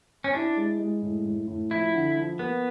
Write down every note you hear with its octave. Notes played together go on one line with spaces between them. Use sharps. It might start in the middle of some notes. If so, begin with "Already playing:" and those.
C#4
D4 E4
G#3
G#3
A2
A2
A2
F3 E4
D3
F3
A#3 B3